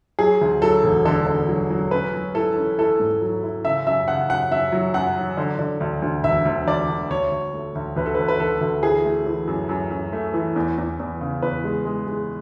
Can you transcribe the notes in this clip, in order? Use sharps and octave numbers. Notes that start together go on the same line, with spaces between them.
F#3 G#4
D2
F#3 A4
E1
D3 A4
D3
F#3
F#3
C#4 B4
F#3
E4 A4
C#4
E4 A4
G#2
F#3
E4
C#3 E5
F#2 E5
C#3 F#5
F#2 F#5
F#2 E5
F#3
F#2 F#5
F#3
D3
D3
D2
D2
E1 E5
D2
D2 D5
D2
D2 C#5
D2
A3
D2
D2 B4
A4
B4
D2
B4
D2 A4
D2
E3 G#4
A3
E3
F#2
F#2
F#2
A3
E3
E2
E2
E2
C#3
E2 B4
G#3
G#3
G#3